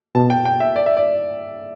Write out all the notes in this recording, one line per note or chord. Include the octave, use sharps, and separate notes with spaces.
B2 A5
G5
G5
E5
D5
E5
D5